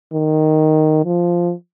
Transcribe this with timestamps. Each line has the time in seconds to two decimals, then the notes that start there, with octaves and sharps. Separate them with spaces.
0.14 D#3
1.05 F3